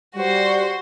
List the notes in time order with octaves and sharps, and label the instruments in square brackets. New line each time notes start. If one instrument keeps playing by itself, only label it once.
[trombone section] G3 [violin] F#4 C5